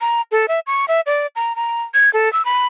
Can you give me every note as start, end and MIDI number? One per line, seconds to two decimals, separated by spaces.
0.01 0.21 82
0.32 0.46 69
0.48 0.60 76
0.67 0.85 85
0.88 1.01 76
1.06 1.27 74
1.36 1.55 82
1.56 1.82 82
1.94 2.12 92
2.14 2.31 69
2.33 2.45 88
2.45 2.67 83